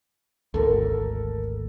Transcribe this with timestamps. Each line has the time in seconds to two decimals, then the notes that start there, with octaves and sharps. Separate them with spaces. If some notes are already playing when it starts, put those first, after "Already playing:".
0.54 G#1 D2 A4 A#4